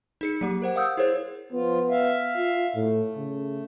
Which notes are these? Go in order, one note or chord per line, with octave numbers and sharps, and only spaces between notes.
D#4 G#4 C#7
F#3 A#3 G4
A#4 C5 F#5
F5 F#5 D#6 E6 G6
E4 G#4 A#4 C5 C#5
F3 B3 F4
E5 F5
F4
A2 A3
C#3